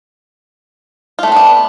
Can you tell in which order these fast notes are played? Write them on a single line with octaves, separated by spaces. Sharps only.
F4 A3 C4 D4 B3